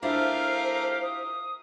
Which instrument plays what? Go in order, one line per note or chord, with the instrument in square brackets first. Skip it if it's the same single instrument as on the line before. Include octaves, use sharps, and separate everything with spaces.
[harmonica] A3 G4 A#4 [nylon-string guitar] D4 E4 F4 [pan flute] C5 [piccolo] F5
[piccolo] D#6